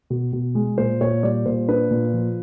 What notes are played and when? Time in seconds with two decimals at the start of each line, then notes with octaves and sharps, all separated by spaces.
0.10 B2
0.33 B2
0.55 G#3
0.78 A#2 C5
1.01 A#2 C#5
1.23 G3 D5
1.46 A#2 C5
1.68 D4 B4
1.91 A#2
2.13 F3